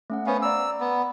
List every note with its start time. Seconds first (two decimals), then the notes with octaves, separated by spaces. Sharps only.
0.10 A3 C#4 F#5
0.26 B3 C#4 C5 F5
0.42 D5 A#5 D6 E6
0.80 B3